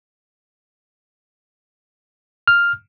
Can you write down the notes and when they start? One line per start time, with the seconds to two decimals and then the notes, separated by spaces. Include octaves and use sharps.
2.48 F6